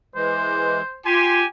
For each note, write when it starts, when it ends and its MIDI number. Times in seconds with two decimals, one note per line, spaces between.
0.15 0.82 52
0.15 0.82 56
0.15 1.01 72
1.06 1.42 65
1.06 1.46 67
1.06 1.46 80
1.06 1.40 84